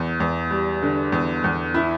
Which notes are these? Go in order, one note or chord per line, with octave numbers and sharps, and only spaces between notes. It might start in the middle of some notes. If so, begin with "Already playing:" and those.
Already playing: E2
E2
G3
D3
E2
E2
E4